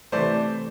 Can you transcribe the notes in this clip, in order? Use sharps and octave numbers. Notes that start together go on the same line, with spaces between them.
C3 E3 A3 C5 D5